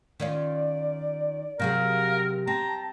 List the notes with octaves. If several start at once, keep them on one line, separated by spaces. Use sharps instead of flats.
D#3 C#4 F4 D5
C3 F#3 G#4 A#4 F5
C4 A5 A#5